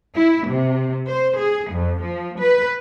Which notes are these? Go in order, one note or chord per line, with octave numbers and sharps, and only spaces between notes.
E4
C3
C5
G#4
F2
F3
B4